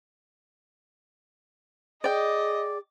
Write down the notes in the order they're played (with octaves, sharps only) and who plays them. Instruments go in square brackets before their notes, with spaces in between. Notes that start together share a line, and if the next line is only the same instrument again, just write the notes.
[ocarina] G#4 [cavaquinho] D5 G5 [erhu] D#5